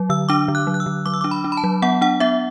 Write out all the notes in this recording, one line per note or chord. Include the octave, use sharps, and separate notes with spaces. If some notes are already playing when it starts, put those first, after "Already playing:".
Already playing: F#3
D3 E6
D4 D6
D3
F#6
F#3
F#6
E6
D3
F#3 D6
E6
D6
D4
B5
D4
B5
A5
F#3
B3 F#5
D4 F#5
B3 E5